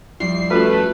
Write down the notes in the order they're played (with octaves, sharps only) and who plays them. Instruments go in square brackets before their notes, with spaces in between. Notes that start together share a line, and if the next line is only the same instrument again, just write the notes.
[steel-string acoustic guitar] F2 G3 E4 [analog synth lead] C7
[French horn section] A3 [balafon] C#4 F4 F#4 [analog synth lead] B4